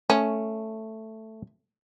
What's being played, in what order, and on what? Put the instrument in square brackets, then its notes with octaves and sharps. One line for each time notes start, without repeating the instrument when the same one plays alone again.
[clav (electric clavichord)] A3 [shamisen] C#4